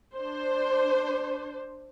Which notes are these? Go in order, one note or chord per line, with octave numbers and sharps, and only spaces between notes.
D4 C5